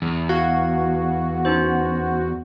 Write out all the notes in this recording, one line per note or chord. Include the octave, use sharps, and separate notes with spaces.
E2
F#4 F5 G#6
C#4 D#4 C5